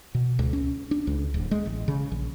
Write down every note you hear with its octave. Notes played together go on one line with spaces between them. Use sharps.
B2
C#2
C#4
D4
C#2
D1
G#3
A1
C#3
A#1